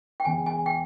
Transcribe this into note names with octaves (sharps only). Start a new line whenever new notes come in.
G5
E1 E2 C#3 G#5
G#5
G5